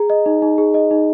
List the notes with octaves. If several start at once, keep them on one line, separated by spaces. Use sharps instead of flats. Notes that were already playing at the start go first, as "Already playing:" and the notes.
Already playing: G#4 A#5
D#5
D#4
D#4
G#4
D#5
D#4